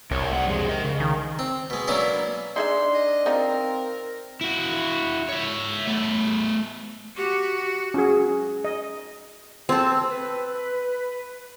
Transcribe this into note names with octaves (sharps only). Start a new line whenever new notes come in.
C2 G2 A#4 C#5
A3 F#5
F2 G#3
A#4 D#5
C#3
D#3
C4
B2 G#3
F#3 A#3 B3 C#4 D4 E4
D4 D#4 G#4 E5 C6
D#5
C4 D#4 F4 A#4
E4 F#4
C#5 E5
A3 B3
F#4 G4
C#4 F#4 G#4
D#5
C4 A4
B4